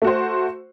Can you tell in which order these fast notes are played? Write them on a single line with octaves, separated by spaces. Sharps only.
A3 F#4 C5